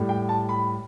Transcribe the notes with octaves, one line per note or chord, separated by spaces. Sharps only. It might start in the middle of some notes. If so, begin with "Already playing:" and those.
Already playing: A2 G3
G5
A5
B5